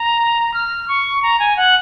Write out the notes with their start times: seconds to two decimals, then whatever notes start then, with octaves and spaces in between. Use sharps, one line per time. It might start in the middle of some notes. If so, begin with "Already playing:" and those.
Already playing: A#5
0.54 F6
0.88 C#6
1.23 A#5
1.40 G#5
1.57 F#5